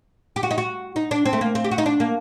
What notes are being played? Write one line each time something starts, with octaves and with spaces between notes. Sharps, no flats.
G4
F#4
D#4
F#4
D#4
D4
C4
A3
A#3
C4
G4
F#4
D#4
D4
A#3